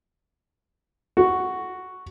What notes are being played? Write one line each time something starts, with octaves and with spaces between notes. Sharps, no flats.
F#4